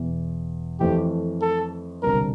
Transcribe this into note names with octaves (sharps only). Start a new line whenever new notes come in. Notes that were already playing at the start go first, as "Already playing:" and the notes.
Already playing: E1 E2 E3
F2 E3 A3 E4 G4
A4
E1 D2 C3 G3 D4 A#4